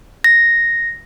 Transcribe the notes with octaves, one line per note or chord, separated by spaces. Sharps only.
A#6